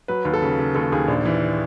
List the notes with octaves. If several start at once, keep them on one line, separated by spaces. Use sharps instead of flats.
F#3 B4
D#2
A4
C#3
C#3
D#2 A4
D#2 G#4
A#1
E3